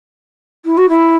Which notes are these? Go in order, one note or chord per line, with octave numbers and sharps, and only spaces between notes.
E4
F#4
E4